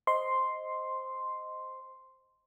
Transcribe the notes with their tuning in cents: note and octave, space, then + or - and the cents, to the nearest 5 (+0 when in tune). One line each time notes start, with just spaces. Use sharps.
C5 +0 D#5 +0 C6 +0